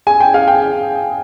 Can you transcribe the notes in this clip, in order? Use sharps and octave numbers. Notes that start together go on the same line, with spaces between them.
G#4 G#5
G5
G#4 F5
G5